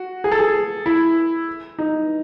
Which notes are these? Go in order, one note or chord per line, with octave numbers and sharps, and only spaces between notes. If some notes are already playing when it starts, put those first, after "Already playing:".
Already playing: F#4
G#4
A4
G#4
E4
D#4